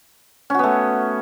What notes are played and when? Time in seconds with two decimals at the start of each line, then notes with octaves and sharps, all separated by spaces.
0.50 C#4
0.54 F#4
0.59 B3
0.64 A3